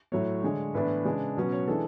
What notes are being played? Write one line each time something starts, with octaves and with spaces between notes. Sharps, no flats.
A2 F#3 A3 C#5
D3 G#3 D4
A2 E3 B3 D4 B4
C#3 G#3 D4
B2 F#3 C#4 B4
C#5
E3 G#3 D4 A4